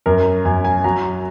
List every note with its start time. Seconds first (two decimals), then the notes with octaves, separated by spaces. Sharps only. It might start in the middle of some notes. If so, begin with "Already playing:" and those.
0.06 F#2 A#4
0.45 F#2 G#5
0.64 G#5
0.84 F#3 A#5